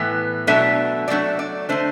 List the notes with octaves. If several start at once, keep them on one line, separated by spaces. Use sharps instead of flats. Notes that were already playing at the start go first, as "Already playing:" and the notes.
Already playing: A2 E3 B3
B2 F#3 A3 D4 E5
B2 F#3 A3 D4 D5
D5
D3 A3 D4 C5